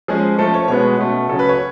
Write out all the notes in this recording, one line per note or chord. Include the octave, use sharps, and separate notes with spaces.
F3 G#3 C#4 G#4
F3 A3 C#4 A4
C#5
B2 G#3 B3 C#5
B2 A3 C#4
C#3 F#3 C#4 A4
B4
C#5